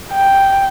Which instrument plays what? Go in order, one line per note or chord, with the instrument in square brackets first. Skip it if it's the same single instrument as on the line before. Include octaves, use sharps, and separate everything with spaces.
[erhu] G5